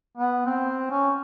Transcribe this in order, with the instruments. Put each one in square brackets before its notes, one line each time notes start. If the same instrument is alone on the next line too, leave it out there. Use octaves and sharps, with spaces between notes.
[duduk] B3
C4
C#4